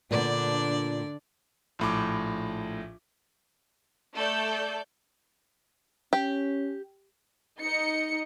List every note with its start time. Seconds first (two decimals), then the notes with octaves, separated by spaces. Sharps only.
0.11 A#2 D3 B3 D4 D5
1.79 A#1 A2 D6
4.14 A3 A4 D5 G6
6.13 C#4 G4
7.59 D#4 D#5 C#7